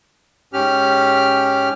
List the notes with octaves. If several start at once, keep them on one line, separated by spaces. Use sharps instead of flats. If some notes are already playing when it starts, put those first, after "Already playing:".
G#2 C#4 G4 F6